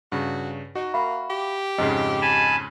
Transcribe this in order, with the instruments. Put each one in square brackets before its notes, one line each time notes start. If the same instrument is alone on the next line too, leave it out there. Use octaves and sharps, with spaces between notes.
[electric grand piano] G2 C#3 [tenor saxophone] F#4
[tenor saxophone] D#4 [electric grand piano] F#4
[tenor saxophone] A#3 [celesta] E5 F5 B5
[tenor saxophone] G4
[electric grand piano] F2 G#2 C#3 [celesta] D#5
[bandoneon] G#5 A5 B5